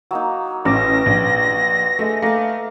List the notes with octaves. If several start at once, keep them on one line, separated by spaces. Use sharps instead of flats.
F#3 A#3 D#4
A1 B4 D6 A#6
A#1
G#3 A3 E5
A3 A#3 F5